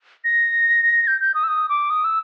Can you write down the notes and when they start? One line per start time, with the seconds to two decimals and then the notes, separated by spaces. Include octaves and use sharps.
0.24 A#6
1.07 G6
1.21 G6
1.34 D#6
1.44 E6
1.48 D#6
1.69 D6
1.90 D#6
2.04 E6